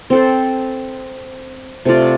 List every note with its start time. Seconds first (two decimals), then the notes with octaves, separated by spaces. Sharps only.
0.10 C4 A4 C5
1.85 C3 A3 F4 D5